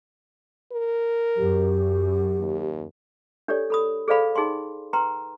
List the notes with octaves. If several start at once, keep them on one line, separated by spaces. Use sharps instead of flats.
A#4
F#2 G4
D#2
D4 G4 A4 C#5 D5
A4 B5 D#6
G#4 A4 C5 D5 F5 B5
D#4 G#4 G5 G#5 C6
B4 G5 A#5 C6